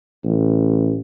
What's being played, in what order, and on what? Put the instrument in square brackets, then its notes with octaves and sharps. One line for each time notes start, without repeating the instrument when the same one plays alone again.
[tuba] A1